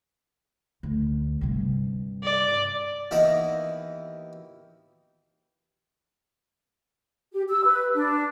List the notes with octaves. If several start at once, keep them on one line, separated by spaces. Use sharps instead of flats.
D2
G2 C3
D5
D#2 E3 B3 D#5 A#5
G4
E6
B4
D4